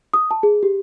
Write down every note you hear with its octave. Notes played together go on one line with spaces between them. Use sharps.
D#6
A5
G#4
G4